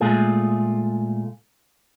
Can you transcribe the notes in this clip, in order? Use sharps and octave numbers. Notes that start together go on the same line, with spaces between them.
A#2 G#3 A3 F4 G#4